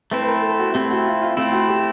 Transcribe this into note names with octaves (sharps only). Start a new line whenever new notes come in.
A3 C4 E4 B4
B4
A#4
A4
F#4
A3 C4 E4 G4
F#4
F4
F4
A3 C4 E4 F4
F#4
G4